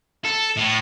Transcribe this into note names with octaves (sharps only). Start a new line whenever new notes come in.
A4
A2